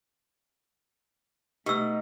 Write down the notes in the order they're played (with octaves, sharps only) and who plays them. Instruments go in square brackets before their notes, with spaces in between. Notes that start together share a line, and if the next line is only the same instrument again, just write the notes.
[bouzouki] B2 [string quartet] A3 D#4 [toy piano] G4 E6